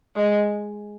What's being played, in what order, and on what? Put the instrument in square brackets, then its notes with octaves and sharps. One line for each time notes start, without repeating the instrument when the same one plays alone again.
[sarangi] G#3